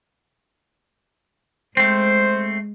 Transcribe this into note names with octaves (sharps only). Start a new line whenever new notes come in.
G#3 A3 C4 C5